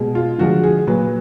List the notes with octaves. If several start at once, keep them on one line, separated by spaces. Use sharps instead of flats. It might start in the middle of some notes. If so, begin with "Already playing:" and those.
Already playing: B2 G#3
F4
D3 F3 G#3 F#4
G#4
A#2 F#3 B4